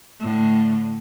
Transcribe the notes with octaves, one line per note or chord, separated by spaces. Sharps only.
A2 D3